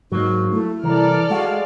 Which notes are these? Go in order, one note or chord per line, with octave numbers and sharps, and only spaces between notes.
G#2 F#3 A#3 D#4
A3 E4
C2 E3 A4 A#4 D5 F6
G#3 F#4 F5